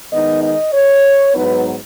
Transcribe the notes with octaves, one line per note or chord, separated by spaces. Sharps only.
D#3 G#3 B3 D#4 D#5
D#5
C#5
G#2 F#3 B3 D#4 B4